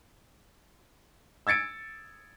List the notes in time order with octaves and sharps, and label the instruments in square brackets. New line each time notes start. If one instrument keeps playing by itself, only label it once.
[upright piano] E6 G#6 A6 C#7 D7